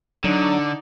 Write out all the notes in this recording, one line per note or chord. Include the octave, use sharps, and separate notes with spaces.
D3 F#3 D4 D#4 D5